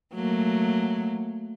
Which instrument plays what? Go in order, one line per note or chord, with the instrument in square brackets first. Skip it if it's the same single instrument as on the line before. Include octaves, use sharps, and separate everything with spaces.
[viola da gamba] F#3 A3 A#3